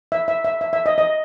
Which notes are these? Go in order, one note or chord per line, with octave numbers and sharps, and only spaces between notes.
E5
E5
E5
E5
E5
D#5
D#5